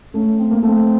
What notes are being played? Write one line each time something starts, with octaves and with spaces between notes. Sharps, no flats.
A3 C#4
C4
A#3
A3 C4